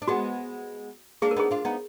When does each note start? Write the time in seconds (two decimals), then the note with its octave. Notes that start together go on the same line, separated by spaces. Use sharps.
0.02 D4
0.08 G#3 B3 F#4
1.22 A#3 D4 G#4
1.31 A#4
1.36 B3 D#4 G#4
1.51 D4 F4
1.65 B3 D#4